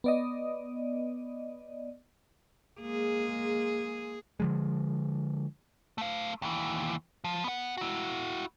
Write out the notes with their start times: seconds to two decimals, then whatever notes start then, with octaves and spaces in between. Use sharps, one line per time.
0.04 B3 D5 D#5
2.81 G#3 A#3 G#4
4.40 D3 F3 G#3
5.98 A3 F5
6.42 D#2 E3
7.24 F3
7.44 B3 F#5
7.77 E4 F#4